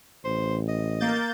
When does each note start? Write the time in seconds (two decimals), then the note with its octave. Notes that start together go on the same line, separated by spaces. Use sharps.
0.25 A1 C5
0.68 D#5
1.00 A#3 G6 A6